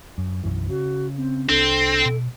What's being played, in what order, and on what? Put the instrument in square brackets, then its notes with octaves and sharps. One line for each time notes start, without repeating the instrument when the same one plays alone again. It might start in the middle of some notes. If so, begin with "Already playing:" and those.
[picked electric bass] F#2
B1 F#2 E3
[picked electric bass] C#3 [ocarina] F#4
[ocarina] C4
[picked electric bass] C2 D4 [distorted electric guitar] C4 [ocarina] A4
[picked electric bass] B2